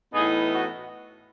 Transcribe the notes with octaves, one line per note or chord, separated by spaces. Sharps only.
A2 E3 B3 D#4 G#4
F#4